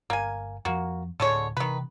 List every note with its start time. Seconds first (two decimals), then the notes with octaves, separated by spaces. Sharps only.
0.10 G1 A#3 G#5
0.65 F2 F3 A#3 F#4
1.20 D2 A2 D3 G#3 C#5
1.57 C3 D#3 E3 B4